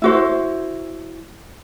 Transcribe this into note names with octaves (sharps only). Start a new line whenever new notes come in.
E4 F#4 C5